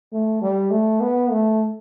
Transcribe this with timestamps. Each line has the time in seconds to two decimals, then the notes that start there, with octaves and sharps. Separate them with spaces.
0.13 A3
0.42 G3
0.71 A3
1.01 B3
1.30 A3